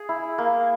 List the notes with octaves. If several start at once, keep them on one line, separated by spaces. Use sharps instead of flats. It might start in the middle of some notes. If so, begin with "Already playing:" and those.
Already playing: G#4
E4
A#3